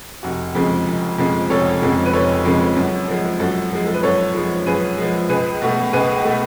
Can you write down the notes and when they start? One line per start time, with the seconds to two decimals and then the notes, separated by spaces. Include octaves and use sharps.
0.23 F1 F#4
0.55 F2 C#3 F3 G#3
0.87 F1
1.18 F2 C#3 F3 G#3
1.50 F1 A4 C#5
1.81 F2 C#3 F3 G#3
2.06 B4
2.13 F1 A4 C#5
2.45 F2 C#3 F3 G#3
2.76 F#2
3.08 F3 G#3
3.40 F#2 F#4 A4
3.71 F3 G#3
3.85 A4
3.94 B4
4.03 F#2 A4 C#5
4.35 F3 G#3
4.66 F#2 G#4 B4
4.98 F3 G#3
5.29 C#2 G#4 B4
5.62 B2 A3
5.93 C#2 G#4 B4
6.25 B2 A3